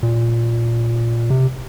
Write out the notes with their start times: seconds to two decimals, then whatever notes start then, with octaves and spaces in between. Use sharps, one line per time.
0.03 A#2
1.30 C3